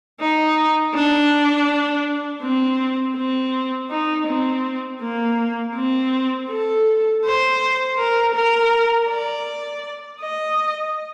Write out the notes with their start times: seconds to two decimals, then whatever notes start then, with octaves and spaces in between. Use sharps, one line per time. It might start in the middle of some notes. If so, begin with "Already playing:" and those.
0.20 D#4
0.94 D4
2.42 C4
3.16 C4
3.90 D#4
4.27 C4
5.02 A#3
5.75 C4
6.51 A4
7.25 C5
7.98 A#4
8.35 A#4
9.09 D5
10.21 D#5